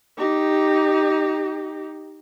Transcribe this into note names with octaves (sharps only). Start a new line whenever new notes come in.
D#4 G4